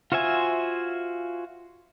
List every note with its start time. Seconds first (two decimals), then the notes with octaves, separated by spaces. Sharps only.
0.12 F4 F#4 C5 E5 G#5